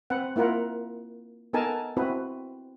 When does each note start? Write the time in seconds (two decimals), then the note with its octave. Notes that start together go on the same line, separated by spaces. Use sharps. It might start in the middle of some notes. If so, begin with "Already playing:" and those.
0.10 C4 B4 F#5
0.36 A#3 E4 F4 A#4 F#5
1.53 B3 D#4 A4 A#4 G#5 A5
1.97 C4 E4 F#4 B4